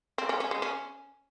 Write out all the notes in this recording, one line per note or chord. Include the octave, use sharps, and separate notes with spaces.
C4
C#4
C#4
G#3
C#4